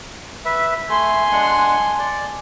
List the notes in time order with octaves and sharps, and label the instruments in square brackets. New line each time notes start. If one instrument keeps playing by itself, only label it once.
[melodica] B4 E5
[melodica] A3 [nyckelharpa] G#5 C6
[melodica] G#3 D4 F#5
D5